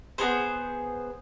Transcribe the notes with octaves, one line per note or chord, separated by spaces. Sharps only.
B3 D#4 G#4 C5